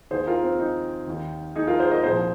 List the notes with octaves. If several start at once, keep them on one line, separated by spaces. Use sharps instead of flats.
D#2 D#3 G#4 C5
F4 A#4
C4
D#4
D#2 D#3
D#4 G#4
F4 A#4
G#4 C5
A#4 D#5
C2 A#2 F3 G#4 C5